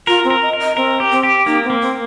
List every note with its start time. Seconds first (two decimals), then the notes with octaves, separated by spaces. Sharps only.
0.07 F4 A#4
0.24 C4
0.30 A#4
0.42 D#5
0.53 A#4
0.60 D#5
0.77 C4 A#4
1.00 G4
1.11 C4
1.23 G4
1.46 A#3 D#4
1.64 C4
1.70 A#3
1.82 C4